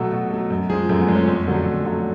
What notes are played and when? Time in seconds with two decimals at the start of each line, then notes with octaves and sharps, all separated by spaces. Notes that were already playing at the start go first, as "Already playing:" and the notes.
Already playing: B2 F#3 A3 A4
0.12 B2
0.31 F#3 A3
0.50 F#2
0.70 F3 G#3 G#4
0.89 F#2 A3
1.01 B3
1.08 F3 G#3
1.15 C#4
1.28 F2
1.47 D3 F#3 A3
1.66 F2
1.85 D3 F#3 A3